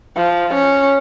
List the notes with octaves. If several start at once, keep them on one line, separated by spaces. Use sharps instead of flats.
F3
C#4